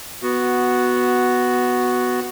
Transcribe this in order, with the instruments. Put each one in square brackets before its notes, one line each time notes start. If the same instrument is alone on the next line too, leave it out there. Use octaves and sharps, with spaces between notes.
[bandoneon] B3 F#4